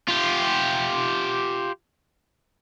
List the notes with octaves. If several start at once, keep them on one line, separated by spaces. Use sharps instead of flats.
F4 G4